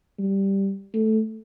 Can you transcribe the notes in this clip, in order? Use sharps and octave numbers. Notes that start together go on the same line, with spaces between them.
G3
A3